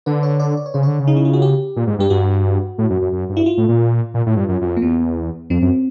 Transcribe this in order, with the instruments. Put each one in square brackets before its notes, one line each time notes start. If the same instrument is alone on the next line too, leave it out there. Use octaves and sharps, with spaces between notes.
[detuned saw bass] D3 [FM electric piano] B4
[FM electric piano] C#5
D5
D5
C#5
[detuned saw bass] C#3 [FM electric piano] C5
[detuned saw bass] D3 [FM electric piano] C#5
[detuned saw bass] C#3
[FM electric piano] D#4
E4
F4
F#4
G4
[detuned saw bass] A#2
G#2
[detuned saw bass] G2 [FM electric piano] G4
[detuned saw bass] G2 [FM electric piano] F#4
[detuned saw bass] A2
F#2
F#2
F#2
G2
[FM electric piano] E4
F4
[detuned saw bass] A2
A#2
A#2
A2
G2
F#2
F#2
F2
[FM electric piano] A#3
[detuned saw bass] E2 [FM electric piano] B3
[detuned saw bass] F2 [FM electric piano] C4
[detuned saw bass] F#2